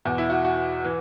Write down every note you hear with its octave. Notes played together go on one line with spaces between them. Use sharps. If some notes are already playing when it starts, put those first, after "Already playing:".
E2 B2 F#4
E4
F#4
F#4
E3